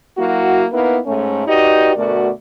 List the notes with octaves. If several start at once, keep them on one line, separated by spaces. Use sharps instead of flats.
F#3 A#3 E4 F#4
A#3 B3 D#4 E4 B4
G#2 A3 C#4
D#4 F#4 G4 B4 D5 D#5
D2 B2 A3 F#4 A#4 D5